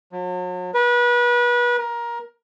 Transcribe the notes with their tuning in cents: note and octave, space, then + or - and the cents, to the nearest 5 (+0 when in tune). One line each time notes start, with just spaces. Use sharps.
F#3 -40
B4 -30
A#4 +20